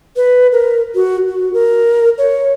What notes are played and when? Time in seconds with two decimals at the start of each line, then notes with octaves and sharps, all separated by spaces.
0.16 B4
0.52 A#4
0.95 F#4
1.29 F#4
1.54 A#4
2.18 C#5